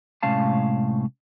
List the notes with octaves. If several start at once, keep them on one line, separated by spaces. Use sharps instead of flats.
A2 C3 G#3 C#4 F5 A5